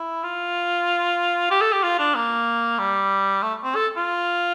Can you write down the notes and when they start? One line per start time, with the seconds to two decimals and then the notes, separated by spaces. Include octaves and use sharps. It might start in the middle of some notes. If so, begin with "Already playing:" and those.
Already playing: E4
0.23 F4
1.51 G4
1.61 A4
1.73 G4
1.83 F4
1.99 D4
2.15 A#3
2.78 G3
3.42 A3
3.64 C4
3.75 A4
3.96 F4